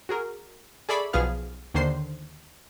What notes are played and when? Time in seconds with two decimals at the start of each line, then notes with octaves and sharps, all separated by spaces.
0.09 F#4 G#4 A#4
0.89 G#4 A4 D5 E5 B5 C#6
1.13 B1 F3 B3 G#4 F5 F6
1.74 D#2 D3 D#3 C5 C6 C7